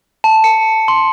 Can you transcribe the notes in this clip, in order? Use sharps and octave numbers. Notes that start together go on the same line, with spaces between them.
A5
C#7
C6